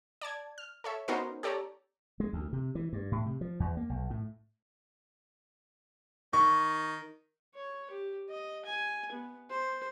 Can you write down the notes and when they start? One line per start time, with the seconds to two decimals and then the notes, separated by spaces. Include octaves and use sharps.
0.21 D5 A5 G#6
0.58 F6
0.84 A4 C#5 E5
1.08 B3 C#4 D#4 F#4 A#4 C5
1.43 G4 A4 C#5 D5 A#5
2.20 G#3
2.33 D2
2.53 C3
2.75 E3
2.93 G2
3.12 A2
3.26 C3
3.41 F3
3.60 E2
3.77 A#3
3.90 B1
4.10 A2
6.33 D#3 C#6
7.55 C#5
7.91 G4
8.30 D#5
8.65 G#5
9.12 B3
9.50 C5